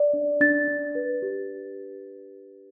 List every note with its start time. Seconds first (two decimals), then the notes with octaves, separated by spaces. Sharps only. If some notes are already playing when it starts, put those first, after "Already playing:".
Already playing: D5
0.13 D4
0.41 D4 A6
0.68 D4
0.95 B4
1.22 G4